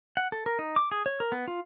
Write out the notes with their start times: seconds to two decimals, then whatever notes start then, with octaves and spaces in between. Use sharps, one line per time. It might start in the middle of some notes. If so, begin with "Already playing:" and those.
0.17 F#5
0.32 A4
0.46 A#4
0.59 D#4
0.76 D6
0.91 G#4
1.06 C#5
1.20 A#4
1.32 B3
1.48 F4